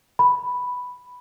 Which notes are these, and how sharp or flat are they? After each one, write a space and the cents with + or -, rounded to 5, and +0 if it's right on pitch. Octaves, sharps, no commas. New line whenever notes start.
B5 +0